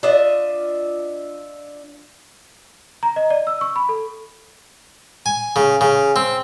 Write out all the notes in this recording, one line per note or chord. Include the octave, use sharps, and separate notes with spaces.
D4 F4 D#5 E5
A#5
D#5
D5
E6
C#6
B5
A4
G#5
C#3
C#3
C4